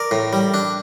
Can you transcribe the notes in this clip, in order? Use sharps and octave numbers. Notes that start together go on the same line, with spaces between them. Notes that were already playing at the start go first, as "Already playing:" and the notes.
Already playing: A#4 D5
A2
G3
D4